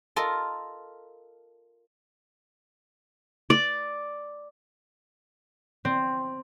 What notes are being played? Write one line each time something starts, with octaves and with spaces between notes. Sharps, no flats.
F4 A4 A#4 D#5
D5
C4